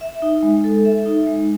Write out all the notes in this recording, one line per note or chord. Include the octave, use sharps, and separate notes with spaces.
E5
D#4
G#3
A4
E5
D#4
G#3